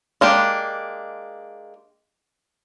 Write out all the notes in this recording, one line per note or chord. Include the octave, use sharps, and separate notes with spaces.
G#3 A#3 D4 G4